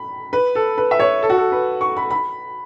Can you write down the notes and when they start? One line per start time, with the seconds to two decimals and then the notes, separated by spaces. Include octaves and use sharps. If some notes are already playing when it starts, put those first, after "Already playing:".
Already playing: B5
0.33 B4
0.55 A4
0.78 B4
0.91 E5
0.99 C#5
1.23 A4
1.30 F#4
1.37 A4
1.52 B4
1.81 C#6
1.97 B5
2.10 B5